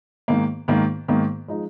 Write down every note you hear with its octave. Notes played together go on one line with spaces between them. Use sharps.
G#2 D#3 A#3
G#2 D#3 A#3
G#2 D#3 A#3
F3 G#3 D#4